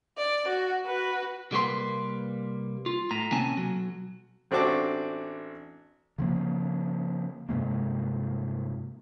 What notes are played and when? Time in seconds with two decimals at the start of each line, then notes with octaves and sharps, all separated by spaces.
0.18 D5
0.49 F#4
0.86 F#4 B4
1.52 C2 G3 A#3 F#4 B4 C6
2.86 F4
3.11 A2 A#5
3.32 C3 A#3 C4 C#4 G#5 A5
3.57 B1 F#3
4.51 A1 C4 D4 F#4 C#6 D6
6.18 C#3 F3 A#3
7.49 G2 C3 G#3 A#3